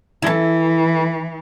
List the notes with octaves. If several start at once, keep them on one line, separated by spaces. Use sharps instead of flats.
E3 E4 A4